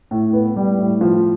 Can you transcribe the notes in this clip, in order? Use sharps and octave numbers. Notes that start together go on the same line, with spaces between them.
A2
B3
G3
A2
F3